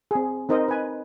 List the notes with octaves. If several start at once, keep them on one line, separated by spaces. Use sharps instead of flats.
C4 G#4
C4 D#4 A#4 C5 D#5
B4 G#5